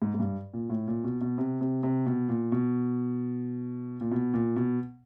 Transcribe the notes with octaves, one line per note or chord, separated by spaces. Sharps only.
G#2
G#2
G2
A#2
A2
A#2
B2
B2
C3
C3
C3
B2
A#2
B2
A#2
B2
A#2
B2